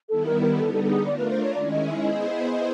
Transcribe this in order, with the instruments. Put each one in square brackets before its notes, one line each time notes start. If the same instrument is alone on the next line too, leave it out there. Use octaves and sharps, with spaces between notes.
[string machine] D#3 G3 B3 E4 [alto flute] A4
[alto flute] A#4
A#4
[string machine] D3 G3 B3 D#4 [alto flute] A4
[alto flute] A4
A4
G#4
[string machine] A3 D4 F4 A#4 [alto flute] D5
[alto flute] B4
C5
C#5
[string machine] D#3 G#3 C#4 E4 G#4 [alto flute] D5
[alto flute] D#5
E5
E5
[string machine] B3 E4 G#4 C5 [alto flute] D#5
[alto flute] D#5